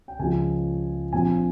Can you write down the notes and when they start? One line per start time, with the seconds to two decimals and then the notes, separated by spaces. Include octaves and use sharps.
0.08 G5
0.19 C#2 C#3 F3 G#5
1.13 A#1 A#2 F3 C4 G#5